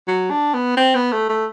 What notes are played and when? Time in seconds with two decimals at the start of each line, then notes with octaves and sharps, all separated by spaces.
0.07 F#3
0.30 D4
0.54 B3
0.77 C4
0.95 B3
1.12 A3
1.29 A3